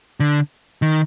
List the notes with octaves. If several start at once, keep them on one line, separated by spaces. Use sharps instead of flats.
D3
D#3